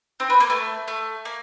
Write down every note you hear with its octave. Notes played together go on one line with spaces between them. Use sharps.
C4
B3
A#3
A3
A3
A#3